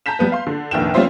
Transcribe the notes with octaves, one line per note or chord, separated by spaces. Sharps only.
A5 A#5 G6 B6 E7
G3 B3 B4
F5 C6
D3
F1 A#1 D#3 G5 E7
G3 B3 C#4 F4 C5 E5